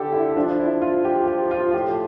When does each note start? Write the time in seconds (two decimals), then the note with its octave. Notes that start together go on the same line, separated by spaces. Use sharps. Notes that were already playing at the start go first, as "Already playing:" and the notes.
Already playing: D3 G4 A4
0.13 E4
0.36 F3 D4
0.60 E4
0.82 F4
1.05 G4
1.28 G4
1.51 F4
1.74 A2 G4